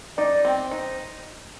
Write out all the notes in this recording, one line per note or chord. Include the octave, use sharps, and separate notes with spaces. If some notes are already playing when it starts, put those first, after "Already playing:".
D#4 D5
C4
D#4